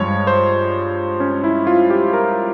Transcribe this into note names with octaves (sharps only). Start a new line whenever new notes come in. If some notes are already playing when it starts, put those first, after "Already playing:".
Already playing: G2 F3 G#3 C#5
C5
C#4
E4
F4
G4
A#4